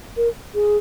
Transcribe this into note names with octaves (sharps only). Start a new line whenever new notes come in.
A#4
G#4